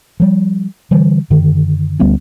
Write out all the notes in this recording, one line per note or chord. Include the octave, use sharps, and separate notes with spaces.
F3 G3
D3 E3 G3
F#2 D3 D#3
D2 G3 B3 C#4